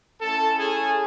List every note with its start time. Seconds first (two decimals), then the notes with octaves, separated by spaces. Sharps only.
0.20 A3 C#4 E4 A4 A5
0.57 G#4 G#5